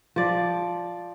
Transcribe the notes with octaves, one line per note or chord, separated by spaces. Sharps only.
F3 D5